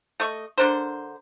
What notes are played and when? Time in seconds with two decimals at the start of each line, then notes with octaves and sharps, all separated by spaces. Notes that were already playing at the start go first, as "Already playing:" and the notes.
0.20 A3 D#5 C#6
0.58 D3 D4 A#4 C5